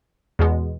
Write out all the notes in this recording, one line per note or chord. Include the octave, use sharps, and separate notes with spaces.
E2 B2 G#3 B3